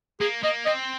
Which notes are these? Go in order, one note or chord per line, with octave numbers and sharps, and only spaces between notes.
A#3 G#4
A#3 D#5
C4 D#5